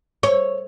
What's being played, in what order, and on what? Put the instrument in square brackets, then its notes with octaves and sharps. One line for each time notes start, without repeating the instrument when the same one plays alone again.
[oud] C#5